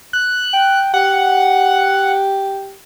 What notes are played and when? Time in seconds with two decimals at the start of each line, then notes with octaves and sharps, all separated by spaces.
0.13 F#6
0.53 G5
0.94 G4 F#5